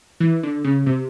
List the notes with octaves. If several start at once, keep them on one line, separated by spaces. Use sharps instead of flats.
E3
D3
C#3
C3